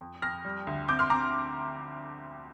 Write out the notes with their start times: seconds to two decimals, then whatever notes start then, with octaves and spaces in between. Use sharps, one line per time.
0.01 F2
0.22 F2 F6 A#6
0.45 G3
0.67 D2
0.88 C4 D6 G6
0.99 C6 F6
1.10 C4 A#5 D6